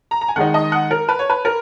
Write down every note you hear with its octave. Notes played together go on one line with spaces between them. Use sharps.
A#5
A#5
G#5
D#3 G#3 D#4 F#5
D#5
F#5
A#4
B4
C#5
B4
A#4